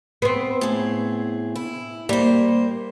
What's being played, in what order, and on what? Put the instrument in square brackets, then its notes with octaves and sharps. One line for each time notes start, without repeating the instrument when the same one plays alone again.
[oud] B3 C4
[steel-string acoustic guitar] A2 G#4
E4
[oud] G3 [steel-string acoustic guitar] A#3 C5